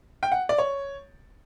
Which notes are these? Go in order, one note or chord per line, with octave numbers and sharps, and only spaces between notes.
G5
F#5
D5
C#5